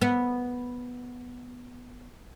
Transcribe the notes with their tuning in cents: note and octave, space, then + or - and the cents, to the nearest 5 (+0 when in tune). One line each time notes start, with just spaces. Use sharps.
B3 -5